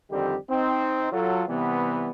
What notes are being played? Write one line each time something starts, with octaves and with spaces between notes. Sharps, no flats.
F2 D3 D#3 G3 C4 G4
C4 D#4
F#3 F4 A4
C3 E3 G3 B3